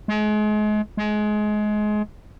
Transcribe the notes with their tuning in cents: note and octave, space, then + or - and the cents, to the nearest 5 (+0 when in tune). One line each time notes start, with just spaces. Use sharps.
G#3 +35
G#3 +25